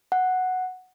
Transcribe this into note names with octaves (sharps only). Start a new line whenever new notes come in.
F#5